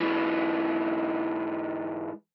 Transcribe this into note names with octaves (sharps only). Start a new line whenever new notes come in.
G#2 E3